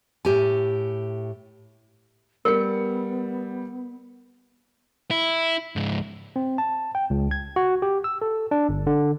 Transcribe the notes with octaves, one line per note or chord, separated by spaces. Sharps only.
A2 G4 G#5
G3 B3 A#4 C#7
E4
C#2 G#2
C4
A5
G5
C#2
G#6
F#4
G4
E6
A4
D4
G1
D3